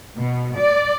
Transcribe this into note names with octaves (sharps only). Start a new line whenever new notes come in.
B2
D5